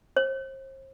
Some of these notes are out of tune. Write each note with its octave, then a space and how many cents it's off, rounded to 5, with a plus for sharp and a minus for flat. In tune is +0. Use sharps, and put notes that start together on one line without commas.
C5 +40